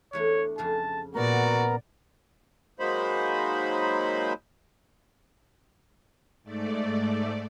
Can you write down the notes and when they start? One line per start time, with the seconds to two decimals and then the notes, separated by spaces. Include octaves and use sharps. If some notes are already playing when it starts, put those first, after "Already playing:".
0.13 E2 A3 D4 C#5
0.58 F2 C#3 G#4 A5
1.15 A#2 B3 F#4 A#4 D5 A#5
2.80 F#3 G#3 A#3 D#4 C5 B5
6.43 G#2 A3 D5